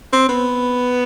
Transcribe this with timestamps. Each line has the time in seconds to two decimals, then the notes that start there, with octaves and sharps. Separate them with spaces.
0.13 C4
0.29 B3